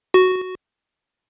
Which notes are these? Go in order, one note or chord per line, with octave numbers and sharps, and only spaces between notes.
F#4